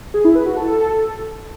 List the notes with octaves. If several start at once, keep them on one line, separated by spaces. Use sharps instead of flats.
G#4
E4
B4
F#4
A4